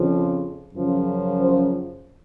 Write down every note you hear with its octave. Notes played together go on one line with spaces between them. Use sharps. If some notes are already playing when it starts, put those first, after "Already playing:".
Already playing: F2 C#3 F3
F#2 C#3 F3
C5